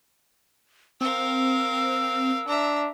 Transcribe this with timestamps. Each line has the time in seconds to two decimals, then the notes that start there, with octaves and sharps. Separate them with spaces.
1.01 C4 A#4 F5 E6
2.48 D4 E5 A#5